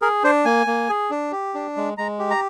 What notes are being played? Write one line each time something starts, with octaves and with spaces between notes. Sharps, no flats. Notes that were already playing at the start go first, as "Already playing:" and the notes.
G#4 A#4
D4 C5
A#3 G#5
A#3
G#4
D4
G4
D4
G#3
G#3 A#5
G4
A#5